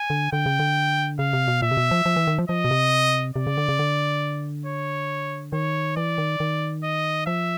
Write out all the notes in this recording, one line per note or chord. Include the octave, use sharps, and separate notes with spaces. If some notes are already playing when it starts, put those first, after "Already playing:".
Already playing: G#5
D3
D3 G5
C#3
D3
C#3 F5
C3
B2
A#2 E5
C3
B2
F3
F3
E3
D#3
F3
F3 D#5
B2
C3
C3 D5
C#3
D3
C#3
D3
C#5
D#3 C#5
E3 D5
D#3
D#3
D#5
F3 E5